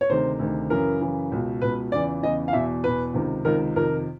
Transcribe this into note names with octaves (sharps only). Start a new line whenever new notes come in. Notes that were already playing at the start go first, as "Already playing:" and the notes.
C#5
D2 C3 D#3 C5
D2 C3 D#3
F#2 C#3 E3 A#4
F#2 C#3 E3
C#2 B2
C#2 B2 B4
E2 C#3 E3 D5
E2 C#3 E3 D#5
F5
E2 B2 E5
E2 B2 B4
C#2 C3 D#3
C#2 C3 D#3 A#4
F2 C3 D#3 A#4